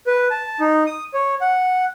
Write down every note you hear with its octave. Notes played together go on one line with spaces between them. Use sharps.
B4
A5
D#4
D#6
C#5
F#5